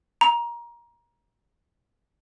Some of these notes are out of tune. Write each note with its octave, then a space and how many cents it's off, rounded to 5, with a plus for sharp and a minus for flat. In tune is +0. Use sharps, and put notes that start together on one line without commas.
A#5 +20